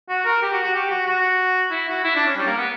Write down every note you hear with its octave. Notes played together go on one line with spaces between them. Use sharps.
F#4
A#4
G4
F#4
F#4
G4
F#4
F#4
E4
F#4
E4
D4
C#4
G3
A#3
B3